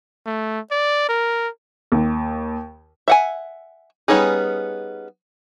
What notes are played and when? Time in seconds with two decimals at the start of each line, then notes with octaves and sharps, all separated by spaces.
0.26 A3
0.71 D5
1.09 A#4
1.92 D#2
3.08 E5 F#5 G#5
4.08 G3 B3 C#4 D#4 G#4